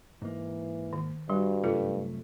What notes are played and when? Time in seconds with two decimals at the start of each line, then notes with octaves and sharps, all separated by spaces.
0.22 G#2 E3 A#3
0.93 D#3
1.29 G2 G3 F#4 C6
1.64 F#2 C3 A3 F4 A4 A#4